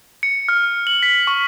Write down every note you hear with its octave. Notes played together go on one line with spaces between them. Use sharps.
C#7
F6
F#7
B6
C#6